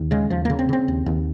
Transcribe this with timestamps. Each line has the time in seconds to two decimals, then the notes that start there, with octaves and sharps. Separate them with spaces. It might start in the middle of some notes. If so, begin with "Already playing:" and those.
Already playing: D#2
0.11 C#3 G#3
0.30 D#2 F3
0.45 C#3 A#3
0.59 C4
0.69 C#3 C4
0.88 D#2
1.06 D#2